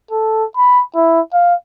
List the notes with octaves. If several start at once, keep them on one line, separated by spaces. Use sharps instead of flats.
A4
B5
E4
F5